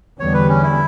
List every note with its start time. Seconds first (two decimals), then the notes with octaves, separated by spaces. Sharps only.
0.20 E2 D3 G3 B3 C#5
0.34 B4
0.49 C#4
0.63 E4